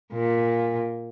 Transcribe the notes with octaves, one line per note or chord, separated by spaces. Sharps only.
A#2